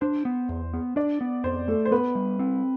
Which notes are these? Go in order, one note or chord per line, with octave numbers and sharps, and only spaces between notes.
D4 C5
B3
E2
B3
D4 D5
B3
F2 C5
A3 A4
C5
B3 B4
G3
C4